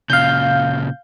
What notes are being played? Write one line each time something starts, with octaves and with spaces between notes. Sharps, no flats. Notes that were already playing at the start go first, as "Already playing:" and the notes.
A#2 C#3 F5 G6